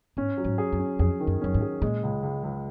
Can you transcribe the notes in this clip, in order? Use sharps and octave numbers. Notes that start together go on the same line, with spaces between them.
G#2 C#4
F#3
G#2
G#4
F#2
C#4
F2 G#4
D#3
F#2
F#2 C#4
G#2
G#4
A#2 G#3
C#2
C#2
C#2